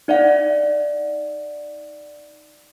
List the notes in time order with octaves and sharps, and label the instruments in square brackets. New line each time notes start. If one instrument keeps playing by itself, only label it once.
[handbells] D#4 D5 E5 F#5